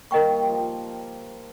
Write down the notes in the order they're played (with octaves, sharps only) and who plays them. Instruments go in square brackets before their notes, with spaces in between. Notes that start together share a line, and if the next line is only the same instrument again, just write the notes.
[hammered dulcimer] G3 A#3 [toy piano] A#4 D#5 G5 C#6
[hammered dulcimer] D#3 G3
D#3
F3
F3